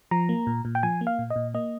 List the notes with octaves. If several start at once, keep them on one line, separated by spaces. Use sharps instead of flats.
F3 A#5
A#3
A#2
A#2
G5
F3 G#5
A#3
F5
A#2
D#5
A#2
A#3 D#5